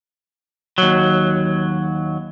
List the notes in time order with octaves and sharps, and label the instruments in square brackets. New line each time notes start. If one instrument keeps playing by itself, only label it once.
[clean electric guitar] D#2 F#3